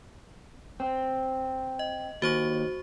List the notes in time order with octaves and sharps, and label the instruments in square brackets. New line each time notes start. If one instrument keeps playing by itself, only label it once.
[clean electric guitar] C4
[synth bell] D#5
[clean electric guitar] D#2 [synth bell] F#4 C5 C#6